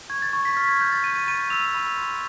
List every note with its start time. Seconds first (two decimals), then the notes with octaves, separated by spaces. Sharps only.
0.10 C#6 G#6
0.22 A6
0.33 C#6
0.45 B6
0.57 F6 B6
0.69 G#6
0.81 F6 G6
0.92 A6
1.04 G6 D#7
1.16 D#7
1.27 B5 D#7
1.50 E6 F7
1.75 B5
1.98 C6